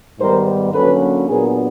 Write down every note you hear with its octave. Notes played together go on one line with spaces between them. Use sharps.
G#2 D#3 G3 B3 A#4 C5
D3 F#3 A#3 C#4 A4 B4
A#2 F#3 B3 D4 G#4 A#4